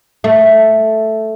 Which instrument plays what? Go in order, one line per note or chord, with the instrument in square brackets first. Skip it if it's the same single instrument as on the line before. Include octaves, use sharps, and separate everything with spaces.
[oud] A3